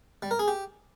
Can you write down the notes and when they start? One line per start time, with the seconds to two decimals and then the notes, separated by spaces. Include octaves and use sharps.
0.22 G3
0.31 A#4
0.39 G#4
0.48 G4